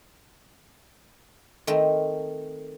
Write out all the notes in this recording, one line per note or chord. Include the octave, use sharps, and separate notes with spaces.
D#3 A3 C4 A#4